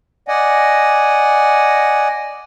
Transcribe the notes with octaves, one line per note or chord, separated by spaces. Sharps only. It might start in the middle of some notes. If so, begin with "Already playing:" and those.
D5 D#5 F#5 G#5